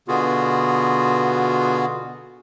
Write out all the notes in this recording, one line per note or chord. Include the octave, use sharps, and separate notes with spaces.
B2 D3 B3 F4 F#4 G#4